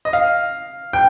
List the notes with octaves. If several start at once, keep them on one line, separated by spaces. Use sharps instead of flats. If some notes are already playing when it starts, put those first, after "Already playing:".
D#5
F5
G5